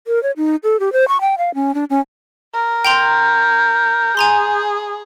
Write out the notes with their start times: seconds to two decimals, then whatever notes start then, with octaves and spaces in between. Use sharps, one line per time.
0.07 A#4
0.23 C#5
0.37 D#4
0.63 A4
0.80 G4
0.93 C5
1.08 C#6
1.21 G5
1.38 F5
1.55 C#4
1.75 D4
1.90 C#4
2.54 A#4
2.85 G5 A#5 C6 G6
4.17 G#4 G#5 A#5 C6